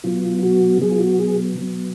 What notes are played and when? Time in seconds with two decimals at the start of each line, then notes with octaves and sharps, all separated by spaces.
0.04 B2 F#3 B3 F4
0.43 F#4
0.81 B2 F#3 B3 G#4
0.92 F4
1.01 F#4
1.19 G#4
1.59 B2 F#3 B3